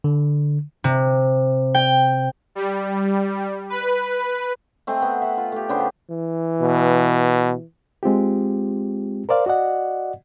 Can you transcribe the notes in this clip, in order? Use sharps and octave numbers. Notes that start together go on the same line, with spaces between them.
D3
C3
G5
G3
B4
A3 C4 G#4 D#5
B3
E5 F#5
F4
A3 G4
C#3 B3 D4 C5
E3
B2
G#3 C4 F4 G4
A#4 C5 D5 F5
F#4 D5 D#5 F#5